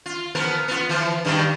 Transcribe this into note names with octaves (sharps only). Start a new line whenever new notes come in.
F4
F3 B3 A#4
B3 F4
E3 F3
G2 D#3 G3